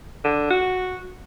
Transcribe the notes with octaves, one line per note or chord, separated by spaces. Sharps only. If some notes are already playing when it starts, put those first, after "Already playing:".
D3
F#4